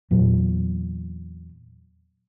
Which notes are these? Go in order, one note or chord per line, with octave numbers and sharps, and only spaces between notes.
E2 A#2 F#3